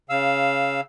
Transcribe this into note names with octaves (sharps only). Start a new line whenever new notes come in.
C#3 F5 E6